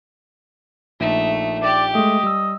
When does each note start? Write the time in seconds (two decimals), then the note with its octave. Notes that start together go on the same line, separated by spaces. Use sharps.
1.00 A#1 A3 D#4
1.63 G4 D5
1.95 G#3 A3 D#5
2.23 G3 E6